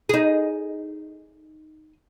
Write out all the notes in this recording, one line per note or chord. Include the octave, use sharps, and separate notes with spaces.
D#4 G#4